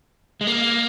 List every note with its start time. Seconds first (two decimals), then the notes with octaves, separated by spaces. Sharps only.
0.41 G#3
0.47 A#3